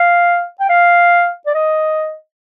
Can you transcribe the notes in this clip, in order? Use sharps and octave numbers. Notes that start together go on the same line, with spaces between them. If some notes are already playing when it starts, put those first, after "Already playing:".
Already playing: F5
G5
F5
D5
D#5